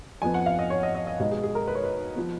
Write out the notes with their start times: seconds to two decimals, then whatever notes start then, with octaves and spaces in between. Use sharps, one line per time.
0.22 F2 F3 B3 G#5
0.34 F#5
0.46 F5
0.59 D#5
0.70 C#5
0.83 D#5
0.95 D#5
1.07 D#5
1.20 B2 G#3 D#4
1.31 G#4
1.44 G#4
1.55 A#4
1.68 B4
1.75 C#5
1.84 B4
2.16 F3 B3